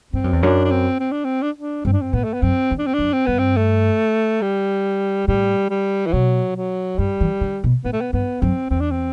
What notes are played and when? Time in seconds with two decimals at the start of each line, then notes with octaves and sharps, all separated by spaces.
0.13 G2 C4
0.24 F#2
0.33 E2
0.43 F#2 D4
0.65 D4
0.71 C4
1.00 C4
1.12 D4
1.25 C4
1.42 D4
1.59 D4
1.85 G2 C4
1.93 D4
2.01 C4
2.13 A2 B3
2.24 A3
2.34 B3
2.42 F#2 C4
2.71 E2
2.79 D4
2.86 C4
2.94 F#2 D4
3.13 C4
3.26 G2 B3
3.39 C4
3.57 A3
4.42 G3
5.27 A2 G3
5.70 G3
6.07 E3
6.13 B2 F#3
6.56 F#3
6.98 G2 G3
7.21 E3
7.41 D3
7.64 B2
7.84 A2 B3
7.93 A3
8.01 B3
8.13 G2 B3
8.41 F#2 C4
8.70 E2 C4
8.80 D4
8.91 C4